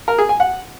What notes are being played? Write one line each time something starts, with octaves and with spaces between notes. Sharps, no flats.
A#4
G#4
G#5
F#5